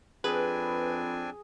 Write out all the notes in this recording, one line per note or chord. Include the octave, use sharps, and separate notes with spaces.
F2 C4 D4 G#4 B4 G#5